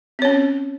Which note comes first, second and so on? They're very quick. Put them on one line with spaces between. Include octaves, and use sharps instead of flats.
C4 C#5 C#4